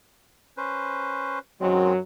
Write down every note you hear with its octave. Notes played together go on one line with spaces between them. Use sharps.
C#4 B4 C5
F#2 D#3 F#3 G#3 C4